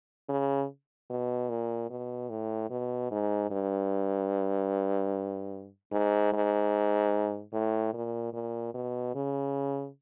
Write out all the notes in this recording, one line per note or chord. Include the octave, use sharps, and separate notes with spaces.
C#3
B2
A#2
B2
A2
B2
G#2
G2
G#2
G#2
A2
A#2
A#2
B2
C#3